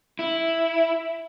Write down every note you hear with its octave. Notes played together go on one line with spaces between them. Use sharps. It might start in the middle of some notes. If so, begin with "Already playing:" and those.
E4